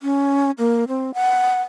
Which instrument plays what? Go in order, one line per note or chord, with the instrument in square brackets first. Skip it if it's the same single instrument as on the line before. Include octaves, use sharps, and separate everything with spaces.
[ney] C#4
A#3
C4
F#5